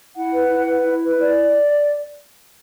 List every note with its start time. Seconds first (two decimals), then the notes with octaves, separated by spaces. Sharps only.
0.16 E4 F#5
0.33 B4
0.49 E4
0.67 B4
0.84 E4
1.02 B4
1.18 E4 D5